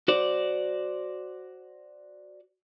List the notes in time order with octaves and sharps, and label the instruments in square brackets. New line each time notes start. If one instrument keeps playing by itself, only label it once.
[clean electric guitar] F#4 C5 D5